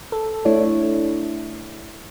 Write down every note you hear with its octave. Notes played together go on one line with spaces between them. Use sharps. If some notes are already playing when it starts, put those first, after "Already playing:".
A4
A3 D4 E4 C#5